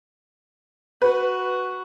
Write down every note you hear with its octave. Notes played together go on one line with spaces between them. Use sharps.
F#4 B4